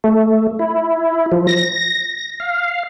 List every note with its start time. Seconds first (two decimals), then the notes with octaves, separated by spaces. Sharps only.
0.04 A3
0.59 E4
1.32 F3
1.47 A#6
2.40 F5